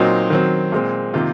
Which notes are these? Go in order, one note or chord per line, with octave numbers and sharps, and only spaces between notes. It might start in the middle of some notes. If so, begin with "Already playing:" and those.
Already playing: A#2 F#3 C4 D#4
D#3 F#3 C4
A#2 G#3 C4
C3 D#3 A#3 F4